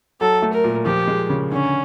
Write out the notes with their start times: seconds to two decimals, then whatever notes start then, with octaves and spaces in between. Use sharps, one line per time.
0.21 F#3 A4
0.42 A3
0.53 A#4
0.64 A#2
0.86 F3 G4
1.07 G#3
1.30 C#3
1.51 D3 C#4